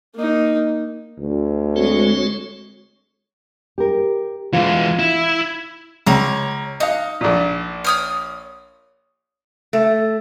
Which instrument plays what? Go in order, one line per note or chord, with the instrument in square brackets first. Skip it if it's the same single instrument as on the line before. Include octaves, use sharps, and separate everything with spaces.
[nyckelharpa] A#3 D#4
[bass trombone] D2
[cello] G#3 C#5 [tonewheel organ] C4 F#4 A4
[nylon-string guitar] G4 A#4
[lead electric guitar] E3 G#3 [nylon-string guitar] F4
[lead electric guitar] E4
[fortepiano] C#2 [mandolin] C#5 A#5
[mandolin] D#4 F#6 [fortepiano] D#5 F5
[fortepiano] A#1 A#2
[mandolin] C#5 D#6 F6
[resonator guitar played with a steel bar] A3